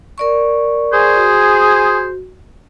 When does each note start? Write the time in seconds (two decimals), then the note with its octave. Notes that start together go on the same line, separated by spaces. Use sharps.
0.18 A#4 D5 C#6
0.93 G#4 C5
1.16 F#4